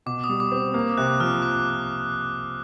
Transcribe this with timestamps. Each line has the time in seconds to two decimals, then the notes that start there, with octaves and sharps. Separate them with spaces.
0.06 B2 D6
0.24 D#6
0.29 G3
0.40 D6
0.52 C4
0.74 A#3
0.97 C3 F#6
1.20 F3 F6
1.42 D6